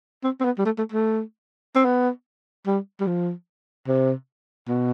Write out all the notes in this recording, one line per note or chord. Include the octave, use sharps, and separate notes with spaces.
C4
C4
B3
G3
A3
A3
A3
C4
B3
G3
G3
F3
C3
B2